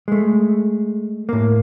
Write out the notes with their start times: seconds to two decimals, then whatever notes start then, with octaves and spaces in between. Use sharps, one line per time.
0.08 G#3 A3
1.29 A2 A#3